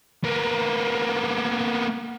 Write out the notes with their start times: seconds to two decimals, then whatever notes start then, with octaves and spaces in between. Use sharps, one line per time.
0.24 A#3 B3